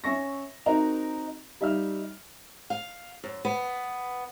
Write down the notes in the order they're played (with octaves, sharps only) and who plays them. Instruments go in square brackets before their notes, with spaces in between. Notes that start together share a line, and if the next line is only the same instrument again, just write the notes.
[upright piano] C#4 E5 C#6 A#6
C4 D#4 F#4 A#4 A#5
G3 D#4 E5 F5 F6
[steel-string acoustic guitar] F5
F#2
B3